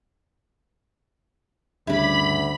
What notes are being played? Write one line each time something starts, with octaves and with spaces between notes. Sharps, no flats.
D2 G2 C#3 E4 B5 D6